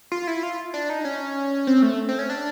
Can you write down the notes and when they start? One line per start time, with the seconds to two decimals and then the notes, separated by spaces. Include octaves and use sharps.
0.12 F4
0.27 E4
0.43 F4
0.74 D4
0.90 D#4
1.05 C#4
1.67 C4
1.82 A3
2.09 C4
2.19 C#4
2.30 D4